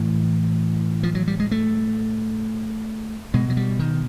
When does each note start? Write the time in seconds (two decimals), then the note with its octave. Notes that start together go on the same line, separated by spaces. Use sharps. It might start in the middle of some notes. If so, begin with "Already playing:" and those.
Already playing: A2 E3
1.03 F3
1.15 F#3
1.27 G3
1.40 G#3
1.51 A3
3.34 B2 G#3
3.50 F#3
3.57 G3
3.79 D#3